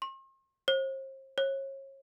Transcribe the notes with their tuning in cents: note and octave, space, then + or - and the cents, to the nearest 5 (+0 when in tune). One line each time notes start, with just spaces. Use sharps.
C6 +45
C5 +40
C#5 -35